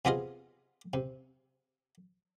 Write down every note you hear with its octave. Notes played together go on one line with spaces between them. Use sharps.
C3 B3 F4 G#4 D#5 F5
C3